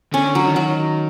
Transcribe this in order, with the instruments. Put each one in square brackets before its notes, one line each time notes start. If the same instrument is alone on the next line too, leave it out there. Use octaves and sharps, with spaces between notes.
[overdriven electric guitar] D3 [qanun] C#4
[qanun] F#3
[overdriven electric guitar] D#3
[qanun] F#3